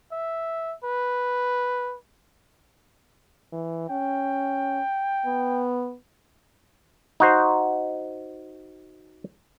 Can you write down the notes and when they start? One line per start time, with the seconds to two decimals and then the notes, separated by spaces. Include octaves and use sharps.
0.12 E5
0.84 B4
3.53 E3
3.90 C#4 G5
5.26 B3
7.20 D#4 F#4 C5